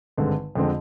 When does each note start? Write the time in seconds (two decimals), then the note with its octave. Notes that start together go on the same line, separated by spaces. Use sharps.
0.17 G#1 G2 D3 G#3 C4
0.55 F2 D3 G#3 C4